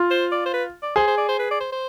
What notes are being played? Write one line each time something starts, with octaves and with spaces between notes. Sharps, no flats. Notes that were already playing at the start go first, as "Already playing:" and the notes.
Already playing: F4
C5
D5
C5
B4
D5
G#4 C5
C5
D5
C5
B4
D5
C5
C5